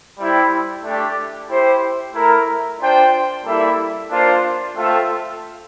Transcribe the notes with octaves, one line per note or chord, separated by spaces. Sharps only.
G3 C4 E4
A3 D4 G4
E4 G4 C5
A3 E4 A#4
D4 F4 C5 G5
G3 A#3 E4 A4 E5
A#3 D4 F4 C5
A3 C4 F4 A4 E5